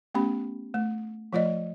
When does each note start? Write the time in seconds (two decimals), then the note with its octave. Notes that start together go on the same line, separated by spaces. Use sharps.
0.14 A3 B3 C#4 G4 B5
0.74 A3
1.33 F3 A3 F4 D5 D#5